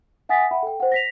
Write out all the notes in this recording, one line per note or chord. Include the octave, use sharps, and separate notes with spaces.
E5 F#5 G#5 D#6 A6 B6
E5 F#5 G5 B5
A4 G5
C5 F#5
A#6 B6 F7